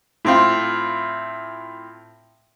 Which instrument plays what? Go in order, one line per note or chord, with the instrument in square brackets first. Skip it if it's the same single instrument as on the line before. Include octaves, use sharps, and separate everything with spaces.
[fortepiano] A2 C4 F4